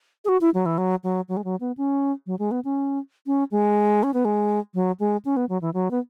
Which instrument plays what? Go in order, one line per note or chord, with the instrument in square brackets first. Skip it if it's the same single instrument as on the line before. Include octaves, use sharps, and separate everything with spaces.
[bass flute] G#4
F#4
E4
F#3
E3
F#3
F#3
F#3
G#3
F#3
B3
C#4
F#3
G#3
B3
C#4
C#4
G#3
C#4
B3
G#3
F#3
G#3
C#4
B3
F#3
E3
F#3
B3